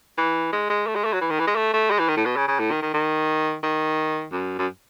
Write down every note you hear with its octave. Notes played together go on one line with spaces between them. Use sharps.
E3
G#3
G#3
A3
G#3
A3
F#3
E3
D#3
E3
G#3
A3
A3
G#3
E3
D#3
A2
B2
C#3
C#3
A2
D#3
D#3
D#3
D#3
F#2
F#2